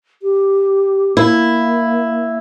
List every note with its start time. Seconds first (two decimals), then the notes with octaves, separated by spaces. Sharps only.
0.22 G4
1.17 A#3 E4